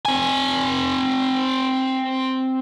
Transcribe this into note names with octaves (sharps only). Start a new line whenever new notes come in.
C4 G#5